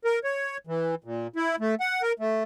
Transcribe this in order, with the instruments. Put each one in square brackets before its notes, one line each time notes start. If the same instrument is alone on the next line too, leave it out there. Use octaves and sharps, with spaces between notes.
[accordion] A#4
C#5
E3
A#2
E4
A3
F#5
A#4
A3